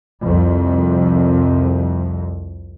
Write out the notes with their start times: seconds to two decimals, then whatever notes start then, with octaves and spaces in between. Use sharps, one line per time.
0.23 C2 F2